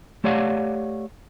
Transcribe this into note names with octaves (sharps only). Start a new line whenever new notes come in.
A3 G4 C#5 D5 F5 F#5